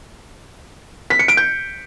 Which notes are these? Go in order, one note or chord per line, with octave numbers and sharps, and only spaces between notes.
B6
C#7
D7
G6